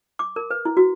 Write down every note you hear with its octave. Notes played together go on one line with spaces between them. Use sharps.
D6
A#4
B4
E4
F#4